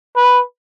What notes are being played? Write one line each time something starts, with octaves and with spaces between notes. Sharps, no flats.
B4